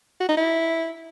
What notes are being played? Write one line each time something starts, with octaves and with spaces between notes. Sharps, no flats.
F#4
D#4
E4